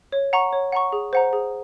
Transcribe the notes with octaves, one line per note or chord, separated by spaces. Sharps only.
C#5
F#5 A#5 C#6
C#5
F#5 A#5 C#6
G#4
C5 F#5 A#5
G#4